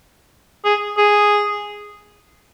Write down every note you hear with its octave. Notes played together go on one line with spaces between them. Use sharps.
G#4
G#4